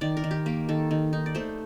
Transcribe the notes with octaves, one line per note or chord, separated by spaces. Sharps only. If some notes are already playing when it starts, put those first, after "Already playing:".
D#3 D5
A#4
D#3
G4
A#3 G4
D#3 A4
D#3
D#4
D5
A3 C5